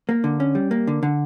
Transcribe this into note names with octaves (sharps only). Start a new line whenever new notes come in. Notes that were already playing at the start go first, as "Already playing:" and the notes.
A#3
D3
C#4
G3
A#3
D3
D3